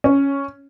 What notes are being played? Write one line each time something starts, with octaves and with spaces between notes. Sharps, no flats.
C#4